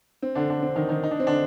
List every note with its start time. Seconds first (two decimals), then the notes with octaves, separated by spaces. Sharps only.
0.22 C4
0.35 D3 D4
0.50 D3 D4
0.62 C4
0.76 D#3 D#4
0.89 D#3 D#4
1.03 D#4
1.11 D4
1.20 C4
1.27 D3 D4